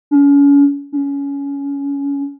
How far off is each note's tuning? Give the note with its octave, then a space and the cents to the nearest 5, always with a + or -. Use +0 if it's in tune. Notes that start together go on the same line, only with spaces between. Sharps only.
C#4 +35
C#4 +20